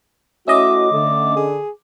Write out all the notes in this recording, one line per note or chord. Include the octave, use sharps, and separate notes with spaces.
A3 C#4 E4 F#4 D#5 E5 D6
D3 A3
G#4